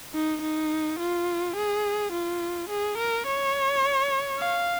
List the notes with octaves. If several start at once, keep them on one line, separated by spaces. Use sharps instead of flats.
D#4
D#4
F4
G#4
F4
G#4
A#4
C#5
F5